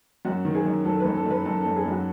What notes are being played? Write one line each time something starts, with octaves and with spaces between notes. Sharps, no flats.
F#2 F#4
D#3
G#4
F#2
F#3 A4
B4
F#2
A4
F#2 B4
F#2 A4
A4
F#2
G#4
F#2
F#4